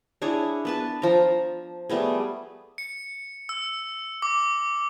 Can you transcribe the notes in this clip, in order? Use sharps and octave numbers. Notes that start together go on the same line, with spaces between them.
D4 E4 G#4 C#5
B3 B4 A5
F3 A#5
G3 A3 B3 G#4
C#7
E6
D6